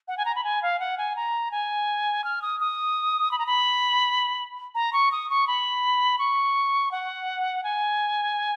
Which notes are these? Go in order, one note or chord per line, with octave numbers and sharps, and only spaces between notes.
F#5
G#5
A#5
B5
G#5
F5
F#5
G#5
A#5
G#5
F6
D#6
D#6
B5
A#5
B5
A#5
C#6
D#6
C#6
B5
C#6
F#5
G#5